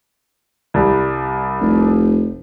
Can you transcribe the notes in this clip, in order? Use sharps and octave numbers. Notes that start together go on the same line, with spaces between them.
C2 G3
F1